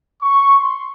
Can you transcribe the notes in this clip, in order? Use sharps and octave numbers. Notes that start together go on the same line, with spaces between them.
C#6
C6